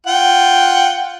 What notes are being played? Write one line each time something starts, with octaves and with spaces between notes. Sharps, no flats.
F4 F#5 G5